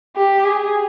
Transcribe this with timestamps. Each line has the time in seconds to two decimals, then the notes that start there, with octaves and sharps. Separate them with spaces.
0.16 G4
0.45 G#4